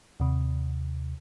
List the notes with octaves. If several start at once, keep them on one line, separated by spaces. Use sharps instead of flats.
D#2 C3